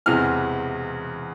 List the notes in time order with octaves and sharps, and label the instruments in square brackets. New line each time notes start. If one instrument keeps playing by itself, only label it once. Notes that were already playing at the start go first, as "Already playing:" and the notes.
[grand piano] E1 E2 C3 E3 F6